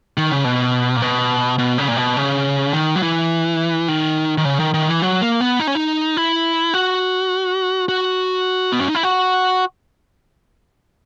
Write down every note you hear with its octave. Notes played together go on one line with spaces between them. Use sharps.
D#3
C#3
B2
A#2
B2
B2
C#3
A#2
B2
C#3
D#3
F#3
E3
D#3
D#3
C#3
D#3
D#3
E3
F#3
A#3
B3
D#4
C#4
D#4
E4
F#4
F#4
B3
C#4
D#4
E4
F#4